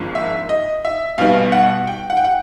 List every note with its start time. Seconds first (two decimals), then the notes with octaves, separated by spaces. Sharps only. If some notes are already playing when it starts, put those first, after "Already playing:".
Already playing: G#1 G#2 F3 A#3 D4
0.15 E5
0.49 D#5
0.85 E5
1.18 B1 B2 G3 B3 F5
1.52 F#5
1.87 G5
2.10 F#5
2.17 G5
2.24 F#5